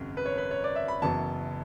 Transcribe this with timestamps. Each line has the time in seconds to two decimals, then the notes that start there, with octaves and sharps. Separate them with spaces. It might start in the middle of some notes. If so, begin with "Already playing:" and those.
Already playing: G#1 F#2 C#3
0.17 B4
0.26 C#5
0.38 B4
0.51 C#5
0.64 D5
0.76 E5
0.88 B5
1.02 F#1 F#2 E3 B3 A5